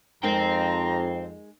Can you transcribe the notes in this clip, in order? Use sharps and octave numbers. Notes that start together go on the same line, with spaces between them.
F2 G#3 D#4 A#4 C5 G5 A#5